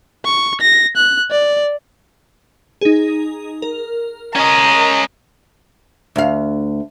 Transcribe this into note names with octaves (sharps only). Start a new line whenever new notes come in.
C#6
A#6
F#6
D5
D#4 G#4
A#4
C#4 D#5 A#5
D2 F5